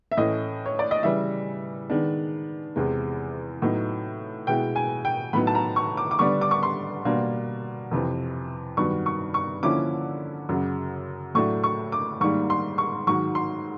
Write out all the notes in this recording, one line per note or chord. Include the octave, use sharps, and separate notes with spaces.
E5
A2 E3 A3 C#4 D#5
C#5
D5
D#5
C#3 E3 G3 E5
D#3 G#3 B3 D4
E2 C3 E3 G#3
A2 F#3 B3 D#4
B2 G#3 B3 E4 G5
G#5
G5
A2 F#3 B3 D#4 B5
A5
A#5
C#6
D6
D6
D3 G3 B3 D4 C#6
D6
C#6
C6
B2 G3 A#3 D4
F2 C3 E3
G2 D#3 F#3 B3 C#6
C#6
C#6
D3 F3 A#3 C#4 E4 D6
F#2 C#3 F#3
A2 F#3 A3 D4 C#6
C#6
D6
G#2 D#3 G3 A#3 C#6
C6
C#6
G#2 D#3 F#3 C#6
C6